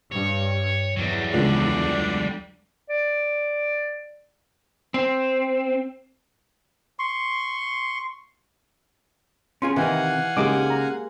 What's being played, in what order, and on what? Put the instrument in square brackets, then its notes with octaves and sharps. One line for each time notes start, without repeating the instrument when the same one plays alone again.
[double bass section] G2 [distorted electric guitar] C#5
[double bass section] E2 [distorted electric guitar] F#3 G3
[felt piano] C#2 [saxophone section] D3 D4
[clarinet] D5
[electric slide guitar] C4
[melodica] C6 C#6
[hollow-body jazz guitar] C#4 F4 G#4 [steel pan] C6
[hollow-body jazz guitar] C3 D#3 D#4 [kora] E3 [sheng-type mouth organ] F5 F#5 G#5
[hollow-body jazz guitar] C#3 D#4 [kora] G#3 A#3 [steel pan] G4 D6
[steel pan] A#5